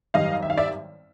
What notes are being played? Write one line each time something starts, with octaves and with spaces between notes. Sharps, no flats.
G#1 F#2 D#3 G3 D#5 F5
E5
F5
D5 E5